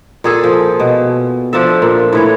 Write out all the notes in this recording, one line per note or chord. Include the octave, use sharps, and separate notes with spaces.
A#2 G#4 A4
F3
B2
F3 D4 A4 E5
A#2
A2 E3 C#5